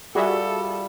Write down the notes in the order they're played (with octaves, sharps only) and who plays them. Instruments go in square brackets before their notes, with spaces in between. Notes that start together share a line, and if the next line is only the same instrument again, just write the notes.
[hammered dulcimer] G3 F4 F5 [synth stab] F#4 G#4 E5 [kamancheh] A4